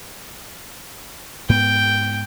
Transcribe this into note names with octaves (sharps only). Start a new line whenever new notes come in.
G#2 B3 G5